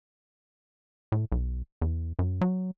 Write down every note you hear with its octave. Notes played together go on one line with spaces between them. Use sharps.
A2
B1
E2
F#2
F#3